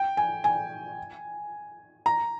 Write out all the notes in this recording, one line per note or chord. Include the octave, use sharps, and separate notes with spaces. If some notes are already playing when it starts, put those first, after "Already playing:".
Already playing: G5
G#5
G#5
A#5